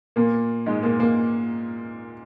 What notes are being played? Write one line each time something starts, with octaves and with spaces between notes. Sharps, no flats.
A#2 A#3
G#2 G#3
A#2 A#3
A#2 A#3